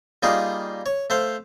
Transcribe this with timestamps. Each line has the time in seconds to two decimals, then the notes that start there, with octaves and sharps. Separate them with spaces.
0.23 G3 A#3 D#4 F4 G#4
0.86 C#5
1.10 A3 C5 F5